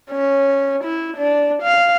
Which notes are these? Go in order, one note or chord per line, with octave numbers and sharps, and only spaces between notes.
C#4
E4
D4
F5